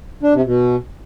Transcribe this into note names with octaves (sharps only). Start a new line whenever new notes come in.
D4
C3
B2